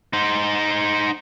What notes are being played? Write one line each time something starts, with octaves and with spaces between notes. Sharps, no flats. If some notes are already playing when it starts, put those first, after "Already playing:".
D#4 C5